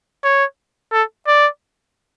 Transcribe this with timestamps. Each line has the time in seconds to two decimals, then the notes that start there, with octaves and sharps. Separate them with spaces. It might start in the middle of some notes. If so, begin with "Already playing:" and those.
0.24 C#5
0.92 A4
1.27 D5